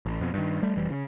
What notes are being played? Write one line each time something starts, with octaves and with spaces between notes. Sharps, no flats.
A1
F2 B2
G2 D#3
G3 A3
F1 E3 G3
C#3